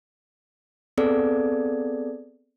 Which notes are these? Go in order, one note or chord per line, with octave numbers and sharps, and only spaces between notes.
B3 C4 G#4 A4 D5